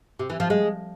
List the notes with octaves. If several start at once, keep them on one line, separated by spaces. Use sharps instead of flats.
C3
E3
F3
G#3